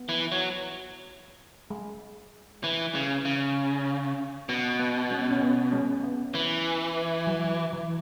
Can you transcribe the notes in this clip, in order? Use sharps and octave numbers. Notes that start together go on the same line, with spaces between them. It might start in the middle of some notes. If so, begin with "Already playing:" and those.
Already playing: B3
E3
F#3
G#3
E3
C#3
C#3
B2 B3
B3
G#3 C#4
C#4
B3
G#3 C#4
B3
E3
F#3
E3